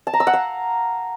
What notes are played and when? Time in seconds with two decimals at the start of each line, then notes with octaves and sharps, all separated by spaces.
0.07 A5
0.13 A#5
0.20 E6
0.27 F#5
0.33 F5